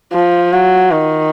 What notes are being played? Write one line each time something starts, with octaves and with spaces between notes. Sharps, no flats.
F3
F#3
D#3